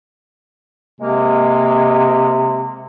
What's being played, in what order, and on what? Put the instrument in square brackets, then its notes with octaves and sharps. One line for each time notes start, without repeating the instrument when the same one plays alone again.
[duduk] C3 [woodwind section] G#3 A#3